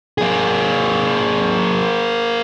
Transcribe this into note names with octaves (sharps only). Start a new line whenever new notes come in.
A#3 G#4